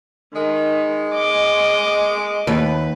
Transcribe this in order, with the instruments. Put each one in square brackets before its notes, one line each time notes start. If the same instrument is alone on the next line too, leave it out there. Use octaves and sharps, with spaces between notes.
[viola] D#3 [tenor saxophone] G#3
[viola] D#5 D6
[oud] D#2 [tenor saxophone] B4